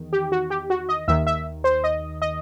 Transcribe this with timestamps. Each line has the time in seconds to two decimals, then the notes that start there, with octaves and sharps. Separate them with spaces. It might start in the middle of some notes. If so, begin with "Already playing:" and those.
Already playing: E2 D#3
0.13 G4
0.32 F#4
0.50 G4
0.70 F#4
0.89 D#5
1.08 D#2 D#3 E5
1.27 E5
1.64 C5
1.84 D#5
2.22 D#5